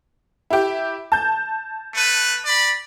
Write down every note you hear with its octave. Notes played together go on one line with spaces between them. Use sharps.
E4 G4
A5 G6
A3 B4
D5 B5